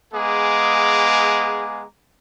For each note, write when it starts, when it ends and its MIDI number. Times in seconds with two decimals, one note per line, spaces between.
0.13 1.85 56
0.13 1.85 59
0.13 1.85 68
0.13 1.85 77
0.13 1.85 82
0.13 1.85 86